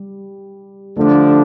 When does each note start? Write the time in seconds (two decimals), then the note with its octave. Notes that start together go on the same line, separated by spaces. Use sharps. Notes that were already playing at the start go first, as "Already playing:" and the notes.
Already playing: G3
0.96 D3 F3 A3 D4